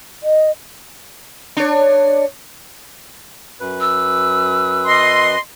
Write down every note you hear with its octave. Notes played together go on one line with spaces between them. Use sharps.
D#5
D4 C#5
F#2 B4
E6
D#5 C6